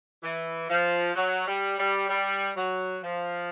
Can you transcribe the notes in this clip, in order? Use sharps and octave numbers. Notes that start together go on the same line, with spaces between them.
E3
F3
F#3
G3
G3
G3
F#3
F3